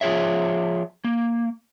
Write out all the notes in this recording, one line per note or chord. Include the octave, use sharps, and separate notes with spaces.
F3 F4 G#4 C#5 E5
A#3